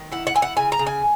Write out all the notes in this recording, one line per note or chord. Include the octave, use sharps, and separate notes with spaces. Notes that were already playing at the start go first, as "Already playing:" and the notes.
Already playing: D#3
E4 F#5
F#5
E4 G#5
F#5
C#3 G#5
A#5
C#3
G#5